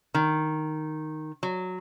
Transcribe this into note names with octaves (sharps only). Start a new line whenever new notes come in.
D#3
F#3